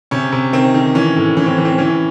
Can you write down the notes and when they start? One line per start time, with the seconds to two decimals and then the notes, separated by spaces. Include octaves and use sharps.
0.11 C3 C#4
0.32 C3
0.53 D#3 C4
0.74 D#3
0.95 E3 C#4
1.16 A2
1.37 E3 C#4
1.46 C4
1.58 E3
1.65 C4
1.78 E3 C#4